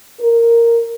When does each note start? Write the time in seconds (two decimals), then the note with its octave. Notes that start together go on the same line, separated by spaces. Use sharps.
0.20 A#4